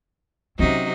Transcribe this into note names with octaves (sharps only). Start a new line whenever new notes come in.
C3 F#3 C4 C#4 D#4